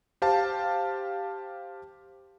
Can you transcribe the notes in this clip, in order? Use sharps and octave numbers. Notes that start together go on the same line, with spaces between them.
G4 C5 F5 A5